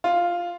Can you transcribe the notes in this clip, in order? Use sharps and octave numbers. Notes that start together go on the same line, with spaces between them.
F4